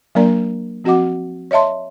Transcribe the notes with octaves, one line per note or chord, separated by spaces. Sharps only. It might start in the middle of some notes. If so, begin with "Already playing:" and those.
F#3 A#3 D4 A#4 D5 A#5
F3 C4 F#4 D#5 F#5 D6
C#5 D#5 E5 A5 C6